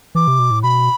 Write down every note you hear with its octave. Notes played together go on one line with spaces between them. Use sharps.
E3 D6
C3
B2
A2
B2 B5